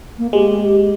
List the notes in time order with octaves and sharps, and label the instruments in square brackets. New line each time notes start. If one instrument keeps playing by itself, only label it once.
[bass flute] A#3
[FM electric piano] G#3 [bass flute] G4